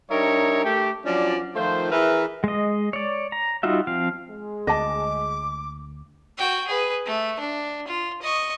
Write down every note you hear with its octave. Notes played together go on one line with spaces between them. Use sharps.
G3 D4 D#4 A#4 C#5 E5
A3 G4
F3 F#3 C#4 D4 D5
D#3 F3 A3 F4 C5
E3 G#4 A#4 B4 E5
G#3 D#5
C#5 D5
A#5
G3 D#4 F4 F#4 E5
F3 C4 F5
G#3
D2 D#5 A5 D6
F#4 G5
G#4 B4
A3
D4
F4
D#5 C#6